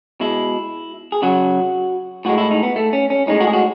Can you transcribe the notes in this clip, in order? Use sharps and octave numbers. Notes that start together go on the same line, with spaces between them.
B2 G#3 E4
G#4
C#3 F#3 F#4
A2 G#3 F#4
E4
D#4
B3
A3
C#4
C#4
A2 G#3 D#4
F#4
G#4
F#4